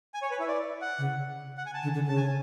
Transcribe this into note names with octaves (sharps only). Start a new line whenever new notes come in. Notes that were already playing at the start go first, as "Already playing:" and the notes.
G#5
C#5
B4
E4
D5
F#5
C#3
F#5
G#5
A5
D3
D3
C#3 A5
G#5